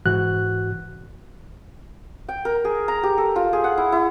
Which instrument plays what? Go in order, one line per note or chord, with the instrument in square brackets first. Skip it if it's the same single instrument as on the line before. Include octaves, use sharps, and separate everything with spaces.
[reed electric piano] G#2 E3 F#4 F#6
[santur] G5
A#4
G#4
A#5
G4
A4
F4
G#4
F#5
E4
E4